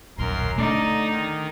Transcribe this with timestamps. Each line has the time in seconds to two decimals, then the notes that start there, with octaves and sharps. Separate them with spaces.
0.18 D#1 B1 F#2 A#4 C6
0.58 D3 A3 D#4 D5
1.11 D#3